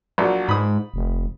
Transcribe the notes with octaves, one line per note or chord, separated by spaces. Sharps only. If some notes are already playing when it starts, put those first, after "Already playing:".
A#1 F#3
G#2 B5 D#6
F1